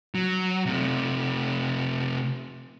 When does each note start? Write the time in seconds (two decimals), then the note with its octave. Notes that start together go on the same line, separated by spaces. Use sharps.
0.15 F#3
0.66 C3 A3